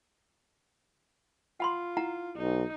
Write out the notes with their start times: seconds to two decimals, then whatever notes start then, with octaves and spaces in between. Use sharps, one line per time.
1.60 F4 F#5 B5 C6
1.97 E4 F#5 A#5
2.37 B1 D#4